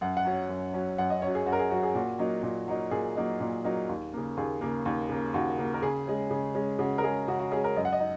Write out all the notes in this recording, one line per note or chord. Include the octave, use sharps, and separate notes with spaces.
F#2 F#5
F#5
F#3 C#4
F#2
F#3 C#4
F#2 F#5
D#5
F#3 C#4 C#5
G#4
F#2 F#4
A#4
G#4
F#3 C#4 F#4
G#4
A#2 F#4
F#3 A#3 D#4
A#2
F#3 A#3 D#4
A#2 G#4
F#3 A#3 D#4
A#2
F#3 A#3 D#4
D#2
C#3 A#3
D#2 G#4
C#3 A#3
D#2
C#3 A#3
D#2 F#4
C#3 A#3
A#4
C#3 G#4
G#3 C#4
C#3
G#3 C#4
C#3 F#4
A#4
G#3 C#4 G#4
C#3 F#4
F#4
G#3 C#4 G#4
A#4
F#2 D#5
F#5
D#5
D#4